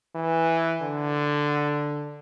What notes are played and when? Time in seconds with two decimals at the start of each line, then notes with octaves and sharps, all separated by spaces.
0.15 E3
0.81 D3